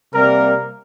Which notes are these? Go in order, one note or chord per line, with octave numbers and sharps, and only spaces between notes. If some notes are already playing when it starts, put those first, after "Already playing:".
C3 G3 A#3 A#4